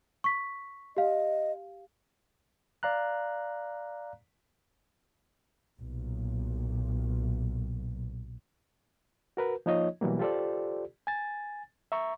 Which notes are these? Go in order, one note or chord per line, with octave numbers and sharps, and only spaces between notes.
C#6 B6
G4 D#5 F5
D5 F5 A#5 F#6
B1 A#2
F#4 A#4 B4
F3 A#3 D#4 F4 C#5 D#5
B2 E3 F#3 G3 A#3
F4 G4 A4 C5 D5
G#5 A6
E5 A#5 C#6